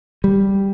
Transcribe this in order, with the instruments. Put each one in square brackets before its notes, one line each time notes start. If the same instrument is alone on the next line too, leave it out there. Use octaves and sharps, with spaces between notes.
[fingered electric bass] G3